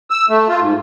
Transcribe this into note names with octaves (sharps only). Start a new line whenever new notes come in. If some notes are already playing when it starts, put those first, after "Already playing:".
E6
A3
F4
G#2